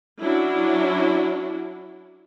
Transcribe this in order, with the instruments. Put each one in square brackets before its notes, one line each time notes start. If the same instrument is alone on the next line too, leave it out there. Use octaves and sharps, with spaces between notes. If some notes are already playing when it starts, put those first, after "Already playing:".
[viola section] F#3 C#4 D4 E4